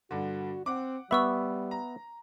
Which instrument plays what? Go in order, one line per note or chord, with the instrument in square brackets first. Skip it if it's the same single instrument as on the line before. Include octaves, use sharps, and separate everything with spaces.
[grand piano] G2 D3 [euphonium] F#4
[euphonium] C4 [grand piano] F#5 D6
[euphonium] G3 [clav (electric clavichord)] B3 E5 [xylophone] B5 C#6 E6
[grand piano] A#5